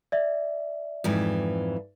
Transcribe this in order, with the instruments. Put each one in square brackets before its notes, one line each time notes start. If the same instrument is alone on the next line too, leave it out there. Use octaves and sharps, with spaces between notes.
[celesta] D5 E5
[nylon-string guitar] F2 G#2 E3